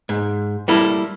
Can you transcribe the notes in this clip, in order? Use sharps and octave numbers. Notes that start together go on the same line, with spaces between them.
G#2
G3 A#3 E4 A4